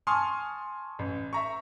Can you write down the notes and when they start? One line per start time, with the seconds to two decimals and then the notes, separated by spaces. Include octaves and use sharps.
0.07 G#5 A5 C6 C#6 D#6 F6
0.99 A1
1.33 E5 A#5 C#6